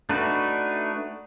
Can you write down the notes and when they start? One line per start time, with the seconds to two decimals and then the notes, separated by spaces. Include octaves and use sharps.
0.09 A3 D4 D#4 F#4 B4